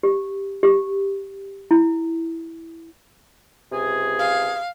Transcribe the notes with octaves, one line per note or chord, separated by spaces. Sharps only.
G4
G4
E4
C#2 C3 G#4
F5